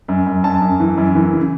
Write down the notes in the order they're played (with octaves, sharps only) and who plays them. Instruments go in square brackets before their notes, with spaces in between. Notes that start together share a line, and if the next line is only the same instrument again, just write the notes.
[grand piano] F#2
F#2
F#2 A5
F#2
E3
F#2
E3
C#3